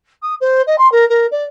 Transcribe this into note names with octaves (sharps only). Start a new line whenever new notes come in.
D#6
C5
D#5
C6
A#4
A#4
D5